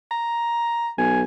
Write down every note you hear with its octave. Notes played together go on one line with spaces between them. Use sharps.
A#5
B1 G#5